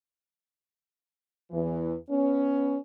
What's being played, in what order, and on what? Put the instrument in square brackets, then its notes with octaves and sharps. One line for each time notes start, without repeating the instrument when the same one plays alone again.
[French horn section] E2 E3
B3 C#4